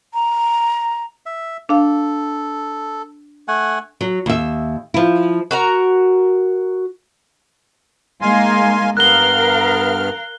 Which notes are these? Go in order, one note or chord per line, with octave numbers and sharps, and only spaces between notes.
A#5
E5
D4 A4 F5
A3 F#5 G#5
F#3
D#2 E5
F3 E4
F#4 A#4 A#5
G#3 A#3 D#4 F5 G#5 C6
G2 B3 A#4 F5 F6 F#6 G7